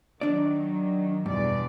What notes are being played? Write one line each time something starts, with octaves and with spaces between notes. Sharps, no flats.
D#3 F#3 D4 D5
E2 G2 B2 D5